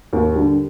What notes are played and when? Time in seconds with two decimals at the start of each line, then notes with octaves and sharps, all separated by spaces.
0.13 D#2
0.35 D3 G3